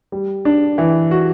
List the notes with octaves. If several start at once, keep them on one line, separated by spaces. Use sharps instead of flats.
G3
D4
E3
F#4